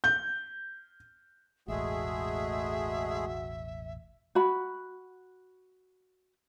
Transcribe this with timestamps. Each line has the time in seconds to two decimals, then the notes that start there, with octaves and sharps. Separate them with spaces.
0.04 G6
1.68 E1 A1 G#3 A3 F#4 G#4 E5
4.35 F#4 B5